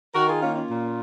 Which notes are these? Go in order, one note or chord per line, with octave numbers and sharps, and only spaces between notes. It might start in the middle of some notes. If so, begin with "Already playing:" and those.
D#3 F#4 A#4
F4 G#4
A#3 C#4 F4
C#4 F4
A#2